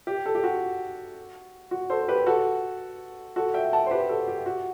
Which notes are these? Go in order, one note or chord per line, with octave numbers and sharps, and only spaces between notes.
G4
A4
G4
F#4
F#4
A4 C5
G4 B4
F#4 A4
F#4 A4
E5 G5
F#5 A5
C5
G4 B4
F#4 A4
G4
F#4